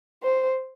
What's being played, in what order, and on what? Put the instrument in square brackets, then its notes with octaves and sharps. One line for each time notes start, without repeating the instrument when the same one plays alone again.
[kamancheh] C5